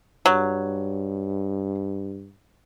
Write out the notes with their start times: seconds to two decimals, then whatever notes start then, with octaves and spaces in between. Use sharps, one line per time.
0.26 G2 F#3